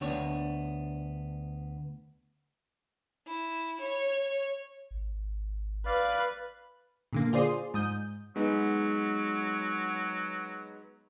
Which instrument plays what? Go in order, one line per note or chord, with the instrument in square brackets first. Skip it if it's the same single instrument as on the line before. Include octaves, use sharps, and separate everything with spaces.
[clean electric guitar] D2 B3 D4 C#5
[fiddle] E4
C#5
[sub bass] G#1
[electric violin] B4 [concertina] D5 F5
[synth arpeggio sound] A#2 D3 A#3
F4 G#4 C5 D5 C6 D#6
G#2 D#6 G6
[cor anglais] F#3 [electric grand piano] G#3 B3 D#4